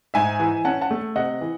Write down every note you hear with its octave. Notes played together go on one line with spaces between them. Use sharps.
G#2 E5 G#5
E3
C#4 F#5 A5
F#5 A5
A3
C3 D#5 F#5
E3